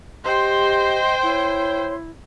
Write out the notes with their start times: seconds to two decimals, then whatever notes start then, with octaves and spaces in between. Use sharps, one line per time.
0.24 G4 C5 D#5 G5 C6
1.23 E4 C#5